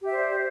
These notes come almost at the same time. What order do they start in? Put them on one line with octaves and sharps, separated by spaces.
G4 E5 C5 D5